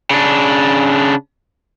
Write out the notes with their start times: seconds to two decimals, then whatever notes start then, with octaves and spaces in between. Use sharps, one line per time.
0.10 C#3 D4